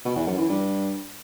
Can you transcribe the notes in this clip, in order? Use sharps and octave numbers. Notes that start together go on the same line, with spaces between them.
B2
E2
F#2
E3
G2